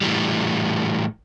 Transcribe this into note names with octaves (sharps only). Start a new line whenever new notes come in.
A2 E3 G3